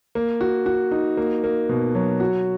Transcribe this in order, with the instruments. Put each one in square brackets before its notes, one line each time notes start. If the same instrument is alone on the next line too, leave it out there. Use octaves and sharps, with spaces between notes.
[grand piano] A#3
F#4
F#4
D#4
A#3
A#3
B2
F#3
F#4